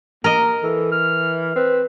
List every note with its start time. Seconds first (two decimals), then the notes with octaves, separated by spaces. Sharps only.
0.24 A#3 A#4 D#5
0.63 E3 A4
0.92 F6
1.56 C4 B4